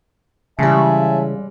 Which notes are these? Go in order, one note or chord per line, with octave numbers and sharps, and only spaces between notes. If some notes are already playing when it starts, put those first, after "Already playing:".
C#3 E3 G3 G#3 E5 G#5 A5